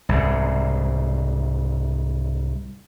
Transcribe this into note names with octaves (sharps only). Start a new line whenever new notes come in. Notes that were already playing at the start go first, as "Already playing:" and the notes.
C2 G#2 C#3